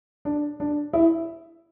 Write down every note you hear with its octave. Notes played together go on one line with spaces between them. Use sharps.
D4
D4
E4